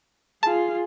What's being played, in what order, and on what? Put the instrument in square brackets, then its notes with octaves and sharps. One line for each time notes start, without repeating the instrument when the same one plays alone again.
[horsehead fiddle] F4 G#4 [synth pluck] A5